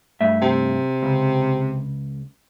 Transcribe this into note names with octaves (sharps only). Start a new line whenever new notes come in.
G2 A3 E5
C3
C#2